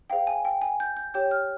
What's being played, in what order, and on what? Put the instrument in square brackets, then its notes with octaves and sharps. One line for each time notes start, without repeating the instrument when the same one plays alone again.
[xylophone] G#4 C5 F5 G5
G#5
G5
G#5
G6
G6
G4 C#5 G5 G6
F6